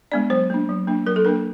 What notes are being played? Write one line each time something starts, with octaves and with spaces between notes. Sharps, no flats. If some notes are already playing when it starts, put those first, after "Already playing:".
G#3 B3 D4 D5
F#3 C5
A#3 D4
F#3
A#3 D4
F#3 A#4
A4
A#3 D4 A#4